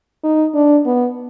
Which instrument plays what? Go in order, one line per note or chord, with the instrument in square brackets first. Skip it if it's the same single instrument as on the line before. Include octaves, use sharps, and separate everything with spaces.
[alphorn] D#4
D4
B3